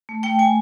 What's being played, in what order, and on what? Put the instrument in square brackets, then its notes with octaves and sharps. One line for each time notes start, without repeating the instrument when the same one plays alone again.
[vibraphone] A3
A3 G5
A3 G#5